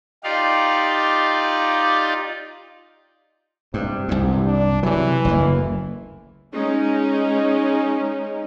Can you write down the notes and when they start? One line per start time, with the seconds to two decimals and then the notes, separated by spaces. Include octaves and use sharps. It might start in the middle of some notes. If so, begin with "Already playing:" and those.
0.24 D#4 F4 G4 D5 F5
3.74 G2 C3
4.08 C2 G2
4.46 D4
4.83 C3 E3 F#3
5.25 F#1 D2 A#3
6.53 G#3 C#4 D#4